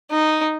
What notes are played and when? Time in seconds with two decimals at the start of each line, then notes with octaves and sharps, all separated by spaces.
0.11 D#4